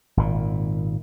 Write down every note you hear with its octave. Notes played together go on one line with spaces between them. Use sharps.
G#1 A#2